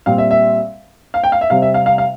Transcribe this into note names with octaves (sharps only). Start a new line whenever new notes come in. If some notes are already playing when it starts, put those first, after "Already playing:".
A#2 G3 C4 F5
E5
E5
F5
G5
F5
E5
C3 G3 C4 F5
E5
F5
F5
F5